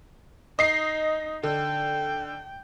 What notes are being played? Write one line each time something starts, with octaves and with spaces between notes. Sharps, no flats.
D#4 D#5 C7
D3 G5